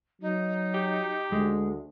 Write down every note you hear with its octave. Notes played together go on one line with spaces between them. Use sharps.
F#3 D#4
G4
D2 G#3